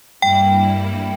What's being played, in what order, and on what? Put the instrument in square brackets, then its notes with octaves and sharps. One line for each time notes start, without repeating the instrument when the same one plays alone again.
[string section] G2 G3 A#3 E4 [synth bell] G5